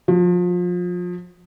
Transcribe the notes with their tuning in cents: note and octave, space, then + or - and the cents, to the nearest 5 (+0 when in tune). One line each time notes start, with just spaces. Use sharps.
F3 +30